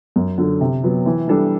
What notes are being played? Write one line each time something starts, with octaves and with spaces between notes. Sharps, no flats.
F#2
D3 F#3
C3
F#3 B3
E3
G3 D4 A4